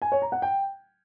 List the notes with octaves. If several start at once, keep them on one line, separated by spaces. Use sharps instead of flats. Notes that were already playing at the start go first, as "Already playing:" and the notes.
G#5
C#5
A#5
F#5
G5